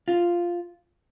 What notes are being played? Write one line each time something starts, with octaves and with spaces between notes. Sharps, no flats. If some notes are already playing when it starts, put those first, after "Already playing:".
F4